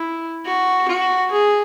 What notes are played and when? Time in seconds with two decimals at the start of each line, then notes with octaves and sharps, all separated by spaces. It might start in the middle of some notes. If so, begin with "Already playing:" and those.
Already playing: E4
0.45 F#4
0.88 F#4
1.31 G#4